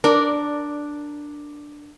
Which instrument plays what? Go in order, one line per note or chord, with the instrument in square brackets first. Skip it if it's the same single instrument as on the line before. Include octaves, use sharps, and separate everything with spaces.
[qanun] D4 [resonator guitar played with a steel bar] A#4 D5